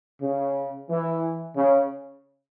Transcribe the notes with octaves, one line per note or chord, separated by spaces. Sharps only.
C#3
E3
C#3